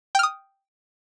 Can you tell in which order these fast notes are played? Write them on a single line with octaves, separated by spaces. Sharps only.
G5 F6 D#6